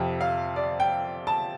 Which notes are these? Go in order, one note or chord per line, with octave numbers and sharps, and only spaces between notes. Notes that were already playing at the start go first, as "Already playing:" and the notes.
Already playing: F2 C3 G5
F5
D5
G5
A5